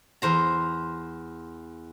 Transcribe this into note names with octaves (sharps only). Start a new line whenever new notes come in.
E2 C5 A#5